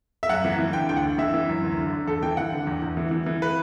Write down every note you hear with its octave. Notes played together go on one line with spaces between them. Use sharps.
E5
F#2 F#5
E3
E3
D3 G5
D2 G5
F#5
D3
E3 E5
E3
F#2
D2
D3
D3
E2 A4
E3 G5
E3 F#5
D3
E2
E2
E3
E3
E3
B4